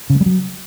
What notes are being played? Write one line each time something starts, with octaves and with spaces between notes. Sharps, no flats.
C#3
G#3
G3
F#3